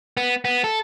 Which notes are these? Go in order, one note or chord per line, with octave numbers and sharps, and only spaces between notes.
B3
B3
A4